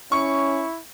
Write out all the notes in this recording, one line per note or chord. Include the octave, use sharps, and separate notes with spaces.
C#4 E4 C#6